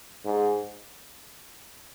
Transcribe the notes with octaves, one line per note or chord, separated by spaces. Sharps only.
G#2